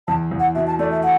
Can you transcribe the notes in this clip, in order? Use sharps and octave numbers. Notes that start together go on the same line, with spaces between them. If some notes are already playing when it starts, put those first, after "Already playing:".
E2 A5
E2
F#5
B2 E5
A5
A3 D5
E5
F#5